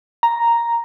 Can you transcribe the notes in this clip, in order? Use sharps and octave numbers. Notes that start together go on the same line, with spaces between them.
A#5